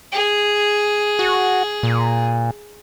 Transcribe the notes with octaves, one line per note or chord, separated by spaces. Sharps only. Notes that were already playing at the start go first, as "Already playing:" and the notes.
G#4
F#4
A#2